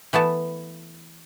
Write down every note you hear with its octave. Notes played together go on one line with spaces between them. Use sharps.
E3 A3 B3 A5